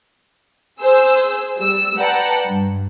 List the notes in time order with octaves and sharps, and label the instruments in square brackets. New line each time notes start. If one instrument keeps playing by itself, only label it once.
[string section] G#4 C5 E6
G3 E6
B4 D5 F#5 G5 A5 A#5
G2